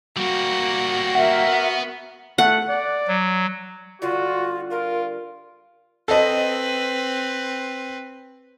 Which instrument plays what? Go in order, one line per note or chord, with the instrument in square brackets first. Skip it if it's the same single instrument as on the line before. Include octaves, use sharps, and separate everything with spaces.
[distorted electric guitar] G3 A#3 [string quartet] F#4
[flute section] A#4 E5 [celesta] F#5
[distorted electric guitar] B3
[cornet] A3 [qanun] F#5
[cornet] D5
[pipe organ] F#3
[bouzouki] D3 G3 [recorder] F4 [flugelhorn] F#4
[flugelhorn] F4 [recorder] A#4
[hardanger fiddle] C4 B4 [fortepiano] A4 D#5